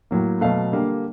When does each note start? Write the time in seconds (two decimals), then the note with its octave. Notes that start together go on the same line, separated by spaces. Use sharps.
0.11 A2 F#3 A#3
0.41 B2 F#3 A3 F5
0.72 D3 G3 A#3